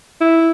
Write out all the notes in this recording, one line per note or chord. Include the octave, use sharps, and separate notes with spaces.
E4